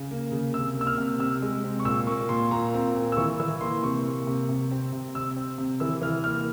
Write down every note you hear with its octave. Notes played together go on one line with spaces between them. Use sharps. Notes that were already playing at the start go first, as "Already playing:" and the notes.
Already playing: C#3
A#3
C#3
C3 E6
A#3 E6
F6
C3
C3 E6
G#3
C4
C#6
A#2 E6
A#3 C#6
A#2 C6
A#2 A#5
C4
A#2
E6
E3 C#6
E3 E6
A#3 C6
C3 C#6
A#3
C3
C3
C4
C3
C3 E6
C4
C3
E3 E6
E3 F6
A#3 F6